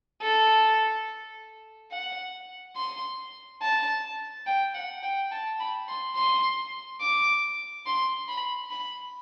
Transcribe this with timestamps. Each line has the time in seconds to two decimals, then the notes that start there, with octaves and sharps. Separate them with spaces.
0.22 A4
1.91 F#5
2.76 C6
3.61 A5
4.46 G5
4.74 F#5
5.02 G5
5.31 A5
5.60 B5
5.88 C6
6.16 C6
7.01 D6
7.86 C6
8.28 B5
8.71 B5